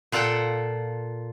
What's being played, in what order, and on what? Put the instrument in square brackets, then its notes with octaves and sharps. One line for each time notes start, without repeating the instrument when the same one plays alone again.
[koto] A#2 F4 A4 F#5 G5